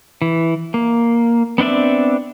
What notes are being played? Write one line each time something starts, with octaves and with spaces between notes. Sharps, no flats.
E3
A#3
B3 C4 D4 D5 E5